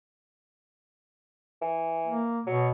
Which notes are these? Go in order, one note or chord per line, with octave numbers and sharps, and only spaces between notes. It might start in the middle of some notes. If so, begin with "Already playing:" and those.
E3
A#3
B2 F#3